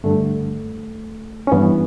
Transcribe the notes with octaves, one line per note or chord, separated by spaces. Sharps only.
G2 D3 A3
C#4
G2 E3 B3